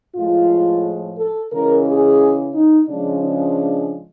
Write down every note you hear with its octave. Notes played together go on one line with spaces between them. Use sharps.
A2 F3 G#3 F4
A4
C#3 E3 G#3 A#4
G#4
D#4
C#3 F3 G#3 D4
D4